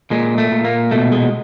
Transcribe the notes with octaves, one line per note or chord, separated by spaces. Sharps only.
A#2 G#3
A3
A#2
A#3
B2 A3
G#3